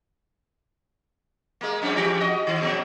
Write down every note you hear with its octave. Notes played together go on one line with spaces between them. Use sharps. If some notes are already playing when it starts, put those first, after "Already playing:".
G#3 A#3
F2 G#2 C#4
G#2 E3 G4
F#4 D#5
D#3
A#2 C#3 F#3